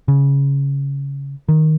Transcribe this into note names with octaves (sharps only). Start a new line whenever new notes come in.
C#3
D#3